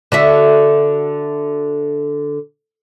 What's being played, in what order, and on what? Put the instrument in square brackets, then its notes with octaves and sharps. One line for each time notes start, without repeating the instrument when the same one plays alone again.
[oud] D3 F#4 E5